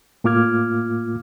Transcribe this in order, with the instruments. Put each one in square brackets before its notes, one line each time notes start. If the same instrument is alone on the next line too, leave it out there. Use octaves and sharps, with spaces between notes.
[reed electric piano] A2 A#3 F4 D6 F6 G#6